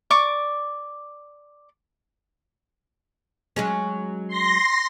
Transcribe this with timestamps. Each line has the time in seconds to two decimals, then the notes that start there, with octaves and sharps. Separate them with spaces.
0.11 D5 C#6 D6
3.56 F#3 G#3 C#4
4.28 C6 A#6